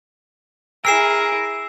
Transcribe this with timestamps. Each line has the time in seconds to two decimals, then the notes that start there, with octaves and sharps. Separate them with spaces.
0.85 E4 G#4 A#4 E6 C7 E7